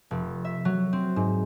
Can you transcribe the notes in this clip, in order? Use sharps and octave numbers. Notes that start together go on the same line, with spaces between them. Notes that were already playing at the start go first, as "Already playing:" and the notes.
F1
E5
F#3
C4
G#2